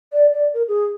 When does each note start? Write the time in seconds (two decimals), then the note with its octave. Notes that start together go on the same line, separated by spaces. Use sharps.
0.13 D5
0.33 D5
0.54 A#4
0.68 G#4